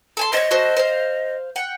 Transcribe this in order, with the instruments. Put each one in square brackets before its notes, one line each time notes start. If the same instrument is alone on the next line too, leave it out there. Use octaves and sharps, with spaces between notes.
[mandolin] A4 G#5 C6
[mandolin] C5 C#5 [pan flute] D#5
[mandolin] F#4 A4 C5
C5 F5
F#5 G5